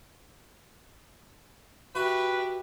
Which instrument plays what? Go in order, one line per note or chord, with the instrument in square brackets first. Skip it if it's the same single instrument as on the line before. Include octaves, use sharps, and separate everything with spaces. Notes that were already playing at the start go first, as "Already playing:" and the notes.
[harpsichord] F#4 [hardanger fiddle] G4 E5 [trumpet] B4